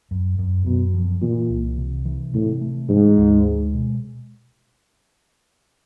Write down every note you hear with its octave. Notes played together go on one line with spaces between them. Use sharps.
F#2
F#2
F#2 B2
F3
A#2 E3
C2
C3
E3
A2 C3
A3
G#2 E3
D2
G#3
B2